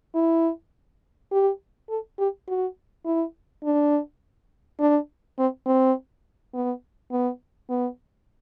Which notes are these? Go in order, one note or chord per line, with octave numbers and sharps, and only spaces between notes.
E4
G4
A4
G4
F#4
E4
D4
D4
C4
C4
B3
B3
B3